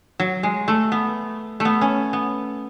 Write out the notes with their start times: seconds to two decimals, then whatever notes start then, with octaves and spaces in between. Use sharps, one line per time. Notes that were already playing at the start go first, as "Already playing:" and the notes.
0.20 F#3
0.43 G#3
0.68 A3
0.92 B3
1.60 A3
1.65 B3
1.81 C#4
2.13 B3